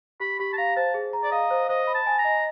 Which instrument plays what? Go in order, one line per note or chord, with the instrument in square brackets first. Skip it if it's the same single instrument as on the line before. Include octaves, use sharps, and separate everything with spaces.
[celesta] G4 [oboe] B5
[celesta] G4 [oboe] B5
[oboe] A5
[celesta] F5 [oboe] A#5
[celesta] C5 [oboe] A5
[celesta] G#4
A#5
[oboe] D5
[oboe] D#5 [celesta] F5
[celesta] C5
[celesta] C5 [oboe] D#5
[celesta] B5
[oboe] A5
[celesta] G#5
[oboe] A#5
[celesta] D#5